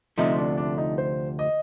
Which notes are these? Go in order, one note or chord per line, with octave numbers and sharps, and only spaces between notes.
D2 C3 F3 A3 D#4
D4
D4
D#4
C5
D#5